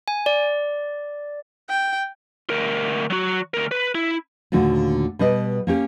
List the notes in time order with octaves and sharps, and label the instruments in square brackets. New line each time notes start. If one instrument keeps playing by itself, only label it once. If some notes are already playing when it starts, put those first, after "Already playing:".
[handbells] G#5
D5
[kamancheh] G5
[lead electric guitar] D2 A#4
F#3 F#4
D2 A#4
B4
E4
[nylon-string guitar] D#2 A#2 D3 A3 F#4
B2 G3 B4 D#5
A#3 C#4 G4